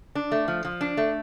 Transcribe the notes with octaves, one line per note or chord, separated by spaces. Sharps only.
D4
A3
F3
F3
D4
A3